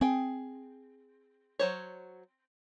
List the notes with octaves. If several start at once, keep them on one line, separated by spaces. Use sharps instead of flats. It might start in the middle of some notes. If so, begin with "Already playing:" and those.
C4 G#4 G5
F#3 C5 C#5